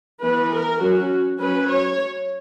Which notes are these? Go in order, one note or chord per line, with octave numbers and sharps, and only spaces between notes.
E3 B3 B4
A#4
F#3 C#4 F#4
F#3 C#4 B4
C#5